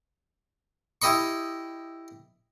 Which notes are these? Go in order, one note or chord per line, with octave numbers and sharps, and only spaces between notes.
E4 G4 D#5 B5 C#6